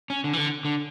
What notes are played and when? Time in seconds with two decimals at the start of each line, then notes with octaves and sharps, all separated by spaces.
0.10 C#4
0.24 D3
0.33 E3
0.38 D3
0.65 D3